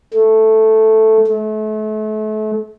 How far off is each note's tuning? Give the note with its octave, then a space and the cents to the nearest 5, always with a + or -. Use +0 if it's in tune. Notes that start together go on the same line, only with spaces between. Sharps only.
A3 +0
A3 -35